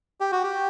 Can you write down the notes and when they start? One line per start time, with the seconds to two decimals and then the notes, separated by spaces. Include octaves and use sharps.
0.20 G4
0.32 F#4
0.43 G4